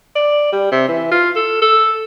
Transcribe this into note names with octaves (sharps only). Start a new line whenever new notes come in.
D5
G3
C3
E3
F4
A4
A4